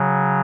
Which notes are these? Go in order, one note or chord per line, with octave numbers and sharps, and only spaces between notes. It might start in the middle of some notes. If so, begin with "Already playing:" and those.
Already playing: C#3 F#3